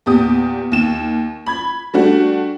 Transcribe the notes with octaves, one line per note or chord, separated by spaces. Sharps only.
E2 A#2 G4 D#6
D#2 E7
B5 G#6
G3 A3 D4 F#4